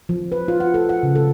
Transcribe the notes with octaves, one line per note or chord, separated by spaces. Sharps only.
F3
B4
F4
F#5
A4
F#5
C#3
A4